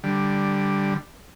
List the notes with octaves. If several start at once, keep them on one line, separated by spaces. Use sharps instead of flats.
D3 G3